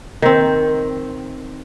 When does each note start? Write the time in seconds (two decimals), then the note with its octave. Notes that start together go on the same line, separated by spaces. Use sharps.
0.22 D#3 C4